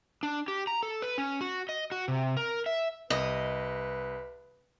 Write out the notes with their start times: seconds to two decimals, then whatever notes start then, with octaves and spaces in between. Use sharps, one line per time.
0.23 D4
0.48 G4
0.67 A#5
0.83 A4
1.02 B4
1.18 C#4
1.41 F#4
1.69 D#5
1.92 F#4
2.08 C3
2.37 A#4
2.66 E5
3.10 C2 B4 D#5